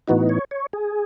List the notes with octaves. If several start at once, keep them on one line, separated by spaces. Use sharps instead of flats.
A2 E3 B3 D#4 F#4
C#5
C#5
G#4